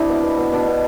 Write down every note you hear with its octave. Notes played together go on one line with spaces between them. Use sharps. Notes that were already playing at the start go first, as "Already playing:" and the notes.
Already playing: C3 D4 E4
B2
B2
B2
B2 D4
B2